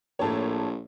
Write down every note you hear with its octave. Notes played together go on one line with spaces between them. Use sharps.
A#1 A2 A#3 C#5 A5